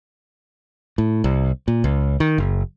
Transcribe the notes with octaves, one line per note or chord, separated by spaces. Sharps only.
A2
C2
A#2
C#2
D#3
F#1